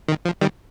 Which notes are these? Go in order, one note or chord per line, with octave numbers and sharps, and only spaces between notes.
D#3
F3
D#3 G3